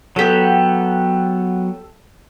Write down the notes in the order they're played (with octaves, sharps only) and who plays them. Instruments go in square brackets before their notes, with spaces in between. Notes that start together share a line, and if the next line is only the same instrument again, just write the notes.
[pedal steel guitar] F#3 B3 [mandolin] G4 A4